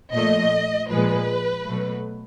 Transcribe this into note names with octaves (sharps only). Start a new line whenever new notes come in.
A#2 F3 A3 D#5
A#2 F3 G#3 B4
B2 F#3 A3